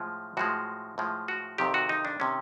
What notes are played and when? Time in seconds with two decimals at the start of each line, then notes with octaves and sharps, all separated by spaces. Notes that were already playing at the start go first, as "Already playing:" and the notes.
Already playing: A2 F3 G#3
0.37 A2 F3 G#3 F#4
0.98 A2 F3 G#3
1.28 F#4
1.58 F2 C3 D#3 G4
1.74 F#4
1.89 D#4
2.05 D4
2.20 C3 D#3 C#4